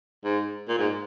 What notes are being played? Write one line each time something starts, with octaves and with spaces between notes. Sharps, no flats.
G#2
A#2
G#2